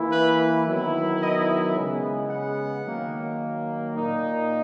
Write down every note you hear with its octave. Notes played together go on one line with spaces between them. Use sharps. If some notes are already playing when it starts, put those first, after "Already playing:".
Already playing: E3 A#3 E4
B4
D#3 F#3 B3 E4
D#5
C#3 G#3 B3
F#5
D#3 F#3 A#3
A#2 A#3 D#4